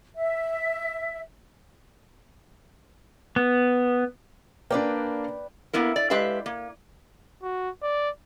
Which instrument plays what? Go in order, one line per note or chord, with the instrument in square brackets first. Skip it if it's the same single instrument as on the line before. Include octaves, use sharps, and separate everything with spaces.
[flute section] E5
[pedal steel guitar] B3
[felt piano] A#3 D4 [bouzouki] B4 D5 G5
[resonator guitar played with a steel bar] A#3 B3 E4 A#4
D5
G#3 G4 B4 E5 F5
A#3
[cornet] F#4
D5